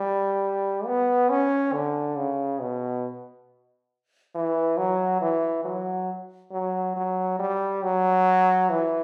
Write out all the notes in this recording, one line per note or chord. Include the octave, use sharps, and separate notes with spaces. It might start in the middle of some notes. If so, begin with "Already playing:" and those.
Already playing: G3
B3
C#4
D3
C#3
B2
E3
F#3
E3
F#3
F#3
F#3
G3
F#3
E3